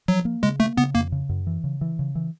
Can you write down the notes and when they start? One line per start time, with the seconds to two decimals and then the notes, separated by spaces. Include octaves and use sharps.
0.08 F3 F#3
0.25 A#3
0.43 C#3 G#3
0.60 A3 A#3
0.77 C#3 B3
0.95 F2 A#3
1.12 C#3
1.29 F#2
1.47 E3
1.64 C#3
1.81 E3
1.99 C#3
2.15 E3